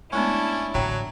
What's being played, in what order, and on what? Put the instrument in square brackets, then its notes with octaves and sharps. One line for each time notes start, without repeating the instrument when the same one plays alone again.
[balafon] G#3 A3 B3 [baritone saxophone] C#4 [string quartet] D4 E4
[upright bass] A1 D3 [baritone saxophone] F#3 [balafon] C#5 G5 A#5